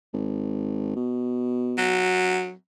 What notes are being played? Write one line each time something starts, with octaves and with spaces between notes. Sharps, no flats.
G#1
B2
F#3